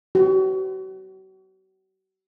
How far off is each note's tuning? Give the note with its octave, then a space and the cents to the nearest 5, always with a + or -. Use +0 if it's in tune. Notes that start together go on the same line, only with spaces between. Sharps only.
F#4 +40